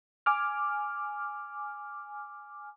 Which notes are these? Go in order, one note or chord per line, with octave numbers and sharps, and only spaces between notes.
G#5 D6 F6